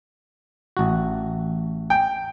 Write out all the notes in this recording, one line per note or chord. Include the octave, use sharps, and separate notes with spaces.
A1 F#4
G5